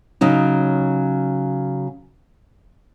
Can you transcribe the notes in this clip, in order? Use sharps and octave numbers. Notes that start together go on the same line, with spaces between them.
C#3 F#3 D#4